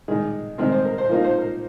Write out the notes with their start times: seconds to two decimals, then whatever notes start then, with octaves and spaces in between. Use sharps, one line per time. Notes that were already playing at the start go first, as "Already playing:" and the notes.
0.08 D#3 G#3 D#4 G#4
0.58 D#3 G#3 C4 A#4
0.72 C5
0.85 A#4
0.98 C5
1.09 F3 A#3 D#4 A#4
1.24 C5
1.38 A#4